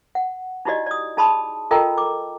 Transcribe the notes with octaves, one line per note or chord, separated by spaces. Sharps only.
F#5
D#4 E4 F#4 G4 D5 D#5
D5 D#6
D#4 G#4 A5 B5 C6 D#6
F4 A4 A#4 D#5 G5 A#5
D6